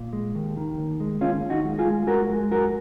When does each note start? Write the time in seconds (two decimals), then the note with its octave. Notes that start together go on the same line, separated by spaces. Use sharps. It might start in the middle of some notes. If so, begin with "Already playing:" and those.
Already playing: A#2
0.13 G#3
0.35 D#2
0.57 D#3
0.78 D#2
1.00 G#3
1.21 D#2 C#4 F4
1.43 D#2
1.50 D#4 F#4
1.65 G#3
1.79 F4 G#4
1.86 G#3
2.07 G#3 F#4 A#4
2.30 G#3
2.51 F#2 F#4 A#4